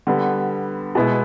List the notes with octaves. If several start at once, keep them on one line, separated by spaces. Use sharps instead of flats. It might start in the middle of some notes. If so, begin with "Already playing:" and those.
D3 G3 B3
B2 G#3 B3 E4